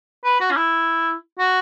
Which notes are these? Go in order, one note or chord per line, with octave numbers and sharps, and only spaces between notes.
B4
F#4
C#4
E4
F#4